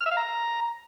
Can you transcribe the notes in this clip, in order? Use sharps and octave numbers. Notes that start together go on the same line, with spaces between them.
F6
E5
F5
A#5